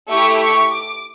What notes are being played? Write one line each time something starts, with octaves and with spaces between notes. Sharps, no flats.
A3 E4 G4 C#6
C#6
D6